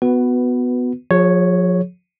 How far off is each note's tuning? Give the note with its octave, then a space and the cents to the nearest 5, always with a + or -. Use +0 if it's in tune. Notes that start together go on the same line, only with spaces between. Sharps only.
B3 +10 F#4 -10 B4 +0
F3 +40 G#4 +0 C#5 +0